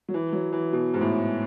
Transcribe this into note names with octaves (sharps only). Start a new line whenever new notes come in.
F#3
E3
F#3
E3
B2
G#2
A2